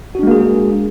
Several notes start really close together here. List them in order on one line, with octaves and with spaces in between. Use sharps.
F#4 D4 G#3 A#3 G#4